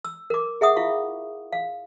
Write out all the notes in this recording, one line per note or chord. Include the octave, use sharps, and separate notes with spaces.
E6
A#4 D6
G#4 E5 F#5 D#6
E4 F4 F5 C#6
F5